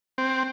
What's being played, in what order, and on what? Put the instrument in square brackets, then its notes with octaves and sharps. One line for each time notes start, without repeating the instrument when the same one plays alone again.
[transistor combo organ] C4